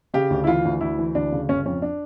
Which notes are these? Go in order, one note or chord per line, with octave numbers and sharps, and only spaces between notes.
C#3 G4
D2
E4
E3 F4
D2
D2 E4
E3
D2 D4
C#3
G1 C#4
F2 C#4
D4